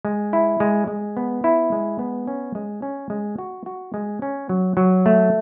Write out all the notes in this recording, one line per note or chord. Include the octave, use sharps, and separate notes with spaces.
G#3
E4
G#3
G#3
B3
E4
G#3
B3
C#4
G#3
C#4
G#3
F#4
F#4
G#3
C#4
F#3
F#3
A3